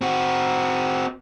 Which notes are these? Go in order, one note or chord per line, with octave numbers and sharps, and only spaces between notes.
C4 F#4